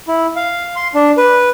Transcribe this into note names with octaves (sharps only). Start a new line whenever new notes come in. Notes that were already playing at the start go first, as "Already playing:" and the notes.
E4
F5
C6
D4
B4